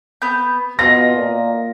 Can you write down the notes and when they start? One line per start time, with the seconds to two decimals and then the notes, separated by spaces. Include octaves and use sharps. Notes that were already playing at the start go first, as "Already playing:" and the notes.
0.22 B3 G6
0.79 B2 F4 D#5 A#6
1.15 A#2